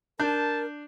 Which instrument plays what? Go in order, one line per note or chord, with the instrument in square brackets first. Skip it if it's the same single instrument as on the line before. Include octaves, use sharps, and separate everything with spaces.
[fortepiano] D4 [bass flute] A#4 [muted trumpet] A5 [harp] G6